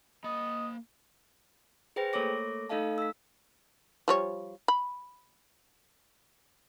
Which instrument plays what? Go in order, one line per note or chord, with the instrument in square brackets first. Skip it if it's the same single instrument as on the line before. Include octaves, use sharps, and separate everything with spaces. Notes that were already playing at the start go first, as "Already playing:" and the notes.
[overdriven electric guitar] A#3 B5 [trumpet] D#5
[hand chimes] G#4 B4 C5 G5 A#6
A3 A#3 A4 C#5 D6 A#6
A3 D#4 A4 D#5 F5 A5
E6 B6
[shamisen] F3 G3 C#5
B5